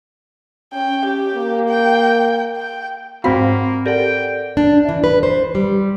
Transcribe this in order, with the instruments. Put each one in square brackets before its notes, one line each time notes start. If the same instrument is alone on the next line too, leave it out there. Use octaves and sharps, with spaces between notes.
[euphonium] C#4 [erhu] G5
[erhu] G4
[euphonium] A#3
[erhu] G5
G5
[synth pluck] G#2 C6 [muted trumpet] A#3 [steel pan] C4 F#4 [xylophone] F5 B5 B6
[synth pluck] G4 A4 F#5 [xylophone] A#4 D5 A#6 [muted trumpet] G5
[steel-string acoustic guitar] D4
E3
B4
C5
G3